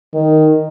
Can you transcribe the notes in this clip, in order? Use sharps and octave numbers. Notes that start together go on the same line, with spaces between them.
D#3